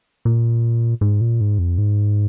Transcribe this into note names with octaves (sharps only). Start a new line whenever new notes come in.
A#2
G#2
A#2
G#2
F2
G#2